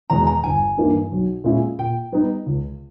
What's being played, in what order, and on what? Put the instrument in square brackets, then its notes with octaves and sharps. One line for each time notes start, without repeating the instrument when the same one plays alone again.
[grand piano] E2 B2 G#3 [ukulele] A#5
[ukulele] A#5
[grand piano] G1 [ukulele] G#5
[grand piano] G2 E3 A#3 D#4
B1
A#2 G#3 C#4 E4
[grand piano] A#2 [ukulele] G5
[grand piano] G3 B3 D#4
C#2